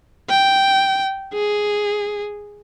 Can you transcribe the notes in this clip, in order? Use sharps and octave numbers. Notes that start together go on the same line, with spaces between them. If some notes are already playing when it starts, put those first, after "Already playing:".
G5
G#4